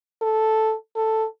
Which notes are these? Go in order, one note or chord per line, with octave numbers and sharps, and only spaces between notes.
A4
A4